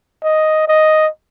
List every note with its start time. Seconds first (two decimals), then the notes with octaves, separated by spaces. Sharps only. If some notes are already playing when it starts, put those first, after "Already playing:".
0.23 D#5
0.68 D#5